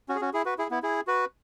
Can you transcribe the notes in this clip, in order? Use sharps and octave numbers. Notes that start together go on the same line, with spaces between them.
C#4 F#4
G#4
C#4 F#4
E4 G#4
F#4 B4
E4 G#4
B3 E4
E4 G#4
F#4 B4